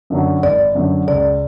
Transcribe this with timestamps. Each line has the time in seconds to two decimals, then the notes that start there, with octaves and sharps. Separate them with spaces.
0.10 F#2 D3 F#3
0.43 G#1 D5
0.75 F#2 D3 F#3
1.07 C#2 D5